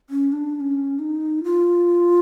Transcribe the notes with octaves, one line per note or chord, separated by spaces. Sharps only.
C#4
D4
D4
C#4
D#4
F4